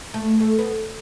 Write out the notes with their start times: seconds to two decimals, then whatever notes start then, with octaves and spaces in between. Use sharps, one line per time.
0.14 A3
0.40 A3
0.59 B3